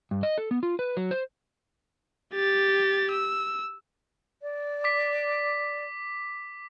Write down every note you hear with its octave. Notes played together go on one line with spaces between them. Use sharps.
G2
D#5
A4
B3
F4
B4
F#3
C5
G4 A6
E6
D5
D6 B6